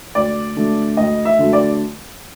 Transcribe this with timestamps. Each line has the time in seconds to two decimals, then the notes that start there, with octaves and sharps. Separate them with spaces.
0.15 D2 D5
0.56 D3 F#3 A3
0.97 D2 D#5
1.25 E5
1.39 D3 F#3 A3
1.53 D5